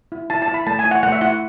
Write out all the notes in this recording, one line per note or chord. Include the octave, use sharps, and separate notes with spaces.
E4
E4 A5
A5
E4
B5
A3 A5
G#5
E4
F#5
A3 F#5
E5
E4 F#5